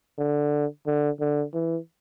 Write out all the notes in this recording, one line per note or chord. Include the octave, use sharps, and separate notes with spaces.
D3
D3
D3
E3